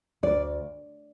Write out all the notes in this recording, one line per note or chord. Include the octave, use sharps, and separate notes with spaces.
D2 D5